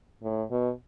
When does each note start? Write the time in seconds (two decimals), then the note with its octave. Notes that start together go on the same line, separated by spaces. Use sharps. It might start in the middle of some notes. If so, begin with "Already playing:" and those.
0.23 A2
0.51 B2